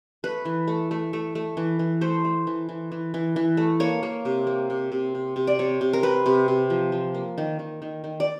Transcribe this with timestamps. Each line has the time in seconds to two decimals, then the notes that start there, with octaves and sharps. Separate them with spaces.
0.24 A3 B4
0.45 E3
0.68 A3
0.91 A3
1.13 A3
1.35 A3
1.57 E3
1.79 E3
2.01 A3 C5
2.25 A3
2.47 E3
2.69 E3
2.92 E3
3.14 E3
3.36 E3
3.57 A3
3.80 A#3 C#5
4.03 A#3
4.25 C3
4.47 A#3
4.70 C3
4.92 C3
5.15 C3
5.36 C3
5.47 D5
5.59 C3 C#5
5.81 C3
5.93 A#4
6.03 C3 B4
6.26 C3
6.48 C3
6.70 F3
6.92 F3
7.15 A#3
7.38 D#3
7.59 D#3
7.82 D#3
8.04 D#3
8.20 D5